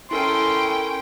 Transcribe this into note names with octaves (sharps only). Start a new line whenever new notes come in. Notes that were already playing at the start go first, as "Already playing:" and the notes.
C#4 E4 A4 A#4 G5 C6